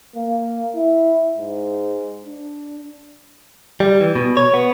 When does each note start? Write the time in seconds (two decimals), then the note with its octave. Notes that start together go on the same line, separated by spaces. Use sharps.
0.16 A#3
0.76 E4
1.38 G#2
2.25 D4
3.80 G3
4.01 E3
4.15 B2
4.37 C#5
4.54 B3